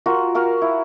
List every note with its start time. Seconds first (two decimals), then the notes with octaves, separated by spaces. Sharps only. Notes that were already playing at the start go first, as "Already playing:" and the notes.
0.06 F4 F#4 A#4
0.35 F#4 A#4 F5
0.62 E4